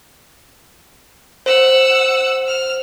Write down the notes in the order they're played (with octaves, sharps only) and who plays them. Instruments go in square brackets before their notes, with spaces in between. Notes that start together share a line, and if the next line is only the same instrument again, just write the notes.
[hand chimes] C5 [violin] F#5 E6
[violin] F6